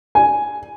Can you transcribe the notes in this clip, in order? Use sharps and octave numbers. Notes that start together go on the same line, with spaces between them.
G#5